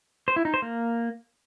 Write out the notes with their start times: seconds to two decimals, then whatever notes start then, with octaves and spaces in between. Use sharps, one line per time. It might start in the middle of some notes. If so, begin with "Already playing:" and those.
0.28 C5
0.36 E4
0.45 D#4
0.54 C5
0.62 A#3